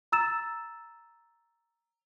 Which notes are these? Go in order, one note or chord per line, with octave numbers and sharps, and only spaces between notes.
A#5 E6 A6 E7